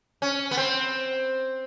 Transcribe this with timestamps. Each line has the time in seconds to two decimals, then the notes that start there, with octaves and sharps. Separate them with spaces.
0.22 C#4
0.51 B3
0.57 C4